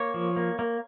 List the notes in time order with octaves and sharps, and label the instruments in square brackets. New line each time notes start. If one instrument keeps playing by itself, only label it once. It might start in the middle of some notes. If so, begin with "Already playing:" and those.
Already playing: [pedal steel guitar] A#3 C#5
F3
A#3
A#3